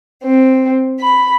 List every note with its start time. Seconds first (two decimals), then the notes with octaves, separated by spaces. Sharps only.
0.22 C4
0.99 B5